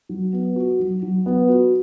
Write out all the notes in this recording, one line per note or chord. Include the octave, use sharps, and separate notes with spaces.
F#3
B3
F#4
F#3
F#3
B3
F#4